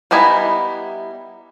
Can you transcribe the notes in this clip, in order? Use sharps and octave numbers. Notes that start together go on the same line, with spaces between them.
G3 B3 D#4 E4 G#5